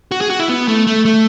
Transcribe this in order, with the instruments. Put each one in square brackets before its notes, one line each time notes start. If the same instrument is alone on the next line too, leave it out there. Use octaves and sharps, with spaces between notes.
[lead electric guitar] F#4
G#4
F#4
E4
B3
A3
A3
A3